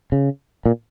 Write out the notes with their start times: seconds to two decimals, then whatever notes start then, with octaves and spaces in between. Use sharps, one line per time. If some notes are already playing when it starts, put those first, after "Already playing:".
0.12 C#3
0.66 A#2